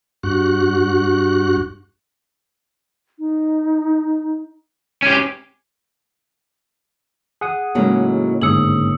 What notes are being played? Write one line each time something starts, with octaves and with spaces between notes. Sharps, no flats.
G2 F#4 F#6
D#4
C#4 G4 G#5
G#4 F#5 D#6
A2 C#3 F#3 G#3 A#3 D#4
G1 G#2 G#4 D#6 E6 C#7 F#7